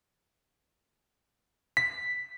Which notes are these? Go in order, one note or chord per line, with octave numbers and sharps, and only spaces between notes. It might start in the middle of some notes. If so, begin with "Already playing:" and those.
B6